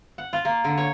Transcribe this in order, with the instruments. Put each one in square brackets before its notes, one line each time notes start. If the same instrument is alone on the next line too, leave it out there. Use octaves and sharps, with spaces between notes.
[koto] F#5
F4
A#3
D3
C#5